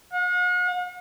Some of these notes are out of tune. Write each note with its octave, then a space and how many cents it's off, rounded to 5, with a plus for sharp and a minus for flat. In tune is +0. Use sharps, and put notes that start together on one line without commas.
F#5 -45